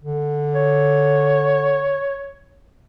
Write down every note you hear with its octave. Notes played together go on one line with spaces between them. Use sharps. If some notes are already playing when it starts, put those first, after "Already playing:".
D3
C#5